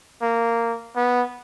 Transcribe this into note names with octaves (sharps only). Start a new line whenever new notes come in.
A#3
B3